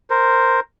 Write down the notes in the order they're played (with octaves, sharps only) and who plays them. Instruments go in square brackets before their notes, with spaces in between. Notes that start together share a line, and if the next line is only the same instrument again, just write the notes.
[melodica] A#4 C5